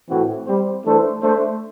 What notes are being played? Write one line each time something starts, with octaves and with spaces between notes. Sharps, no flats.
A2 E3 A3 C4 F#4
G3 C4 G4 C5
E3 A3 D4 A4 C5
A3 D4 A4 C5